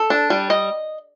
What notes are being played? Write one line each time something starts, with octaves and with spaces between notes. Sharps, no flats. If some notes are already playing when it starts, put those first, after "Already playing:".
Already playing: A4
D4
G3
D#5